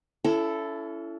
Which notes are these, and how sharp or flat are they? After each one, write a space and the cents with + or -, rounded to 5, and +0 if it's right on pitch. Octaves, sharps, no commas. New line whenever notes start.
C#4 +40 E4 +25 A4 +0